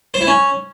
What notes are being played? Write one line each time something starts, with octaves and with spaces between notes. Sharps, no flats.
C5
E4
C#4